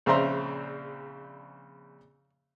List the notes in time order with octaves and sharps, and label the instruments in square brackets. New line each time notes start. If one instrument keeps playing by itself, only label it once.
[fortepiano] A#1 C#3 C4 E5 A#5 C6